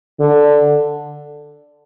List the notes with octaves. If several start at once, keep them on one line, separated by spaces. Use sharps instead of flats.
D3